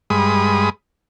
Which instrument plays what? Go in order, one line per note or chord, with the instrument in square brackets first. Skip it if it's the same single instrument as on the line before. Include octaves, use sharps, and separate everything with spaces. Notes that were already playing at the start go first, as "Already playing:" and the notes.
[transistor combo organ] G2 G#3 B5 D#6